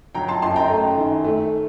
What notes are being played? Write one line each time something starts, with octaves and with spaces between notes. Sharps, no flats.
F#3 G5 A#5
A5 C6
F#2 A5 C6
G5 A#5
A3
D#3
A3